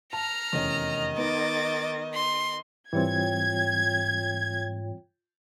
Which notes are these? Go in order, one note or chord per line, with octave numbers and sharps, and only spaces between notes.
A5 A#5 F6
F1 E2 D#3 C#4 D#5
B3 D#4 D6 A6
C6
G#2 E3 G3 C4 F4 C#5 G5 G#6